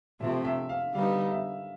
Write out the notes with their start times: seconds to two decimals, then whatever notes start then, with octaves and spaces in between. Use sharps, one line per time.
0.20 C3 F3 A3 C4 E5
0.45 E5
0.69 F5
0.94 D3 G3 B3 D#4 F5
1.31 E5